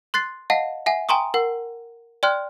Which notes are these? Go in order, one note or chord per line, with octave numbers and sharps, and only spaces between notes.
C6 F#6 A6 C7
D#5 F5 F#5 A5
E5 F#5 G#5
G5 G#5 A#5 C6 C#6 D#6
A#4 F#5
D5 G5 C6 F6 F#6